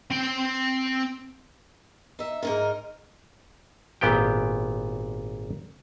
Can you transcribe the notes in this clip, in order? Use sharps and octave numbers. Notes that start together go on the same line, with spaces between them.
C4 G5
D#4 E5
G#2 D#4 A#4
G#1 A#2 B3 G4 G5